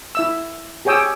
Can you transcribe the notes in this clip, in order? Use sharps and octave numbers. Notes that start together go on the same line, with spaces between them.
E4 E5 E6
G4 G#4 C#5 G5 D#6 E6